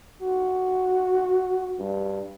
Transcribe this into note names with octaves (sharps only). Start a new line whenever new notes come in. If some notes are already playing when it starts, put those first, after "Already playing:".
F#4
G2